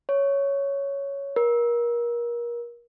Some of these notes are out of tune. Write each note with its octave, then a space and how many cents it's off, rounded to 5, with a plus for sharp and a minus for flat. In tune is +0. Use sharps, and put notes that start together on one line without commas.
C#5 +5
A#4 +30